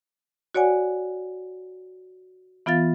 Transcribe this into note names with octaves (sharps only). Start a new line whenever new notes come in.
F#4 C#5 D5 F#5 G#5
E3 B3 F4 F5 A6